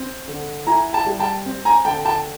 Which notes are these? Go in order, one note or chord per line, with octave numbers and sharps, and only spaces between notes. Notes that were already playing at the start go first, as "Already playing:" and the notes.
Already playing: C4
D3
E4 G#5 A#5
G5 A5
G3
G5 A5
C4
G#5 A#5
D3 G5 A5
G5 A5